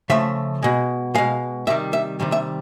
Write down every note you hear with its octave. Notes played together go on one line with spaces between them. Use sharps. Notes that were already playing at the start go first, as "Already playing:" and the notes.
C#3 F3 A3 E5
B2 G#3
B2 G#3 F5
C3 D#3 G3 E5
E5
C3 D#3 G3
E5